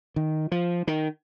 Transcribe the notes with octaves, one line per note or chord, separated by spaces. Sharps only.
D#3
F3
D#3